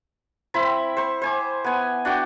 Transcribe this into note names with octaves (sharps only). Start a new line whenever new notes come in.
C4 E4 B5
C5 C#6
C5 G#5 D6
B3 G#5
D4 F#4 G5